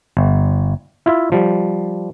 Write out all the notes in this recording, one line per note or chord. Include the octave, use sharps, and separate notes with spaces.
G1
E4 F4 E5
F3 G3